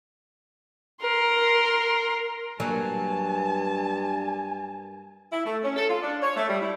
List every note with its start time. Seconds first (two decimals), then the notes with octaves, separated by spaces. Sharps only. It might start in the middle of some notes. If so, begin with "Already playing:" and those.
1.02 A#4 C6
2.60 G2 F#3 A#3 G#5 A5
5.32 E4
5.45 A3
5.63 C#4
5.76 A4
5.89 F4
6.02 D4
6.23 C#5
6.36 A3
6.49 G3
6.62 E4